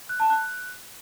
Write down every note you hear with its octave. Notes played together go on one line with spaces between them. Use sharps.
F#6
A5
F#6